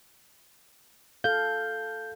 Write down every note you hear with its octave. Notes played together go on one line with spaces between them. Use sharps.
A4 F5 G6